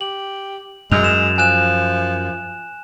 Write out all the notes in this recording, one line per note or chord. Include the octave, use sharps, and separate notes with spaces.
G4 F#7
F#2 G#3 F7
E7
F3 G#5 F#6 E7